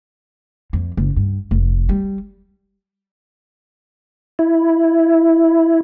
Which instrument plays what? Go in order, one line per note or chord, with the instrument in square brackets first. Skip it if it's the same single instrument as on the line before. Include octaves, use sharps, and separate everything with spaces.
[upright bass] F2
F#1
G2
F1
G3
[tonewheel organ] E4